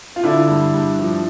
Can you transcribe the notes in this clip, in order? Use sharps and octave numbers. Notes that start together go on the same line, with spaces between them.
F4
D3 D4 E4
G2
G2
F3